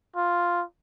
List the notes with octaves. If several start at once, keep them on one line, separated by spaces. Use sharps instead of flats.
F4